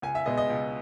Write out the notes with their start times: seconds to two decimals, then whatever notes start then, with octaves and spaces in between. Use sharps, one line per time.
0.02 C#2 G#5
0.15 E5
0.25 B2 G#3 B3 D#5
0.38 D#5
0.50 C#2